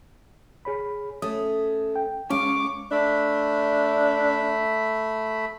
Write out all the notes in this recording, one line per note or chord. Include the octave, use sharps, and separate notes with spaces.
G#4 C#5 B5
A3 C#4 D#6
G5
G#3 C#4 F5 C#6 D6
A3 D4 E5 B5